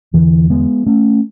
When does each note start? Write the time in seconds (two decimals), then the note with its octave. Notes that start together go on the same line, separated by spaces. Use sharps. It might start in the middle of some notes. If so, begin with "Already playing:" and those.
0.14 E2 D3 E3
0.50 G#3 B3
0.87 A3 C#4